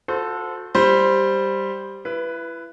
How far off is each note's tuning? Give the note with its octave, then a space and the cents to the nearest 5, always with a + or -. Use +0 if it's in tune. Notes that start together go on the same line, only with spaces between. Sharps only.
F#4 -40 A4 +0 C5 -20
G3 +0 C5 +0
E4 +30 B4 +0